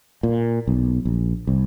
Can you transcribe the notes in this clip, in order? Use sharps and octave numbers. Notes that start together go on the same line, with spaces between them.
A#2
B1
A#1
C2